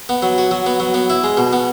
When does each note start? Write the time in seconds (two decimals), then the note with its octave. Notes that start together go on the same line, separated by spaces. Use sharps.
0.09 B3
0.22 F#3
0.38 F#4
0.51 F#3
0.66 B3
0.80 F#3
0.94 B3
1.10 E4
1.24 G#3
1.37 B2
1.53 B3